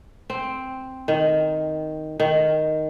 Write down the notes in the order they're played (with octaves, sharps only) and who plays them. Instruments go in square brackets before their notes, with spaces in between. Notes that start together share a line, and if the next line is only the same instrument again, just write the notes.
[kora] C4
D#3
D#3